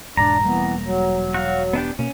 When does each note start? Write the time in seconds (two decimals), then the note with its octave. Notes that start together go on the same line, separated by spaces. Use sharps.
0.17 E1 G#2 D4 D5 A#5
0.45 E1 E3 G3 A#3 B3
0.84 F#3
1.34 F#4 F5
1.73 B3 D4 G4
1.99 B2 A#3 C#4